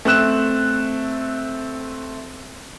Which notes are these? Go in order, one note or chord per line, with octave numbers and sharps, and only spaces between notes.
A3 C4 F#6 E7